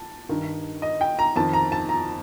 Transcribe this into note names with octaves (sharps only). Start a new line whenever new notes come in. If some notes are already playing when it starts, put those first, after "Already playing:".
Already playing: A5
G2 D#3
D#5
G5
A#5
F2 D#3 A5
A#5
A5
A#5